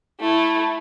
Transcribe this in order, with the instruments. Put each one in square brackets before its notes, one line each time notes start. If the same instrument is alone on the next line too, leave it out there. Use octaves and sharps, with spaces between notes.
[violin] A3 [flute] E4